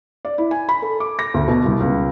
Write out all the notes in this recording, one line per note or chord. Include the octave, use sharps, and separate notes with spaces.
D5
E4
G#5
B5
A4
D6
A#6
D2
B2
C2
C#2